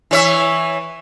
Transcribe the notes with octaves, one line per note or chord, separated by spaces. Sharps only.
E3 C#5 E5